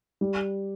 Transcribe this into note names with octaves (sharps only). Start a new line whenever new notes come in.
G3